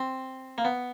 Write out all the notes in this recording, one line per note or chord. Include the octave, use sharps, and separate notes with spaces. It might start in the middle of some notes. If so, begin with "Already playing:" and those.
Already playing: C4
A#3
B3